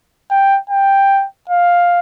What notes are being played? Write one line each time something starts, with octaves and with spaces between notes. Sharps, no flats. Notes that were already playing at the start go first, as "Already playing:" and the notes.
G5
G5
F5